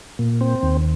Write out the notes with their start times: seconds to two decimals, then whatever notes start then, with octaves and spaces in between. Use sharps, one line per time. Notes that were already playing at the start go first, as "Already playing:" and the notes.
0.19 A#2
0.41 C4
0.63 D#2